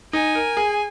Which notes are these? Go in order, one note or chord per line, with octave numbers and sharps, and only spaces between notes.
D#4 G#5
A#4
G#4